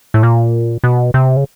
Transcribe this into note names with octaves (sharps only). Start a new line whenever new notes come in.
A2
A#2
B2
C3
C#3